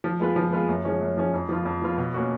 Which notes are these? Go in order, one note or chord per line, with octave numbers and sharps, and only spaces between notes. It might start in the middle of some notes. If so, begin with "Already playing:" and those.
F3
G#3 B3 F4 B4
F3
G#3 B3 F4 B4
F#2
F3 G#3 C#4
F#2
F3 G#3 C#4
F2
F3 B3 F4
F2
F3 B3 F4
B2
A#3 C#4 F#4